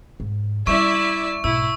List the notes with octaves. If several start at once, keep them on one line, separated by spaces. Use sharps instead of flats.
G#2
G3 C#4 E4 D5 E5 C#6
B1 G#2 E4 E6